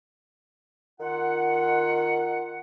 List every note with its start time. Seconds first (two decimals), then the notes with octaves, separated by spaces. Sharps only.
0.99 D#3 F4 F#5